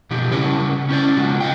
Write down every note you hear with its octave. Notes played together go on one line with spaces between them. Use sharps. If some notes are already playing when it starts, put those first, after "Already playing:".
B2 F3 D#4 G4
C#3 G3 E4 G#4 A#4 C#5
C#4 E4 F#4 C5 D5
C#3 G#3 D#4 F4 F#4
D#5 F5 G5